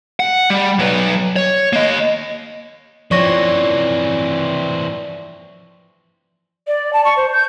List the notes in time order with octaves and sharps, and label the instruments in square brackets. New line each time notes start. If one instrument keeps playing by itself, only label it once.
[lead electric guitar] F#5
G3
F#3 B4
C#5
A#3 D#5
[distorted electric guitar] E3 C4 [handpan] F3 C#5 [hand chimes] D5 C#6 A#6
[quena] D5
A5
C#6
C5
G6